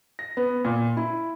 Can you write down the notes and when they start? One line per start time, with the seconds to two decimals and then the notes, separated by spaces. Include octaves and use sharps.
0.19 A#6
0.37 B3
0.65 A#2
0.97 E4